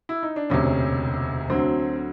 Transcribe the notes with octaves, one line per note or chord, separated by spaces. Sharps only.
E4
D#4
D4
E1 D2 C3 C#4
D2 D3 F#3 C4